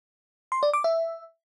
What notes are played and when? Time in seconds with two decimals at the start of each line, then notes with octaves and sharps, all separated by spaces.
0.52 C6
0.63 D5
0.73 D6
0.84 E5